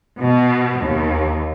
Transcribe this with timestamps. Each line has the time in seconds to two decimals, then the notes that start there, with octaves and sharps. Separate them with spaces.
0.21 B2
0.83 D#2